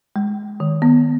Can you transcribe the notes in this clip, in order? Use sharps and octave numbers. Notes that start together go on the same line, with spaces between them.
G#3
D#3
B3